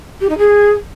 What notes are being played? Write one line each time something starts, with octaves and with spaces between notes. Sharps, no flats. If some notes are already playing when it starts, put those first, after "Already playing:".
G4
D#4
G#4